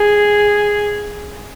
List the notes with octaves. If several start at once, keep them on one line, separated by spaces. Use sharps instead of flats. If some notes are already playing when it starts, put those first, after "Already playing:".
Already playing: G#4